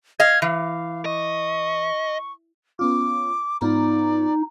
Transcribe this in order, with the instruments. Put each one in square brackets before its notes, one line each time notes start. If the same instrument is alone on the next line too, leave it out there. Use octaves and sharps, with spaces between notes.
[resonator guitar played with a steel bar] D#5 F5 [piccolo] G#6
[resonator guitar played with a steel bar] E3 [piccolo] F5
[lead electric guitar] D#5 [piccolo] C#6
[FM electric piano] B3 C#4 F4 [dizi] D6
[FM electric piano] G#2 B3 F4 [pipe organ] D#4 [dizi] D5